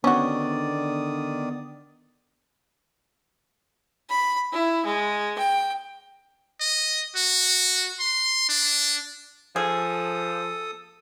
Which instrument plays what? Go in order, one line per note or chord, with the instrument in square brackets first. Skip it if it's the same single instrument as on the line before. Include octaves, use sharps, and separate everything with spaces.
[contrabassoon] D3 [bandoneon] D#3 D5 D#6 [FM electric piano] B3 [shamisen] C#4 F#4
[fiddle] B5
E4
G#3
G5
[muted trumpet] D#5
F#4
C6
D4
[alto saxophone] F3 [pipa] G#4 [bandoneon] A4 D#6